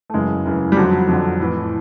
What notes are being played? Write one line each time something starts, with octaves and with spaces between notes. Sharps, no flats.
A3
F#2 C#3 E3 G#3
F#2 C#3 E3
G3
F2 D3 F#3
F2 D3
A2 E3